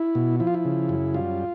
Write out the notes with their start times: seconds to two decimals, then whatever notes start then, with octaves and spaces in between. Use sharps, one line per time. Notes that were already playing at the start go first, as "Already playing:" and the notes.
Already playing: E4
0.15 B2
0.40 F3 E4
0.47 F4
0.54 E4
0.65 C#3
0.89 F#2
1.14 G3 F4